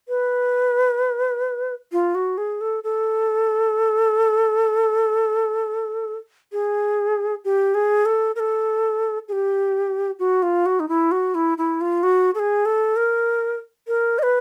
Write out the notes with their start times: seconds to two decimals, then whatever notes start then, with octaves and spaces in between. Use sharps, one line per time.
0.08 B4
1.92 F4
2.15 F#4
2.38 G#4
2.61 A4
2.84 A4
6.52 G#4
7.45 G4
7.75 G#4
8.05 A4
8.36 A#4
8.40 A4
9.28 G#4
9.32 G4
10.19 F#4
10.43 F4
10.66 F#4
10.80 D#4
10.89 E4
11.12 F#4
11.35 E4
11.58 E4
11.81 F4
12.03 F#4
12.35 A4
12.39 G#4
12.66 A4
12.96 A#4
13.88 A#4
14.19 D#5
14.23 B4